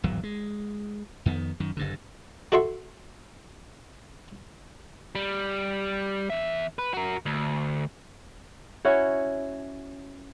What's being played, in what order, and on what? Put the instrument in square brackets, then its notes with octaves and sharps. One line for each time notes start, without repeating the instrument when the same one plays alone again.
[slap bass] D1 G#1 E2 F#3
G#3
F2 D#3 B3
F#2 D#3
F#1 G2 D3
[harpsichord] F#4 A4 E5 C6 C#6
[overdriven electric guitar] G3
E2 E5
B4
F#4 A#4
D2
[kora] C#4 E4 F#4 C#5